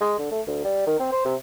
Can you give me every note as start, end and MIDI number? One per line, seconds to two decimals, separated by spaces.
0.01 0.16 56
0.19 0.28 50
0.31 0.41 57
0.47 0.60 38
0.65 0.85 55
0.87 0.96 51
1.00 1.11 60
1.12 1.22 72
1.25 1.35 48